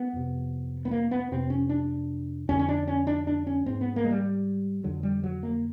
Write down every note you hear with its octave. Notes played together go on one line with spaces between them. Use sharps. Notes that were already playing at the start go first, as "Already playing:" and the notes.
Already playing: B3
F2 C3
B3
A#3
B3
F2 C3 C4
C#4
D4
F2 D3 C#4
C#4
D4
C#4
D4
D4
C#4
G#2 C4
B3
A#3
G#3
G3
F2 D3 F#3
G3
F#3
A#3